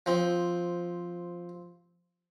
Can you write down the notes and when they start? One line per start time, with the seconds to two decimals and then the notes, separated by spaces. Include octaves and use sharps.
0.06 F3 C4